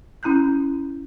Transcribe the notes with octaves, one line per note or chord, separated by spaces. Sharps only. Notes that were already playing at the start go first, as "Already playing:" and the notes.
C#4 E4 A#5 F#6 G6